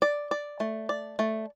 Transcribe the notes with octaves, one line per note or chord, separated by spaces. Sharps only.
D5
D5
A3
D5
A3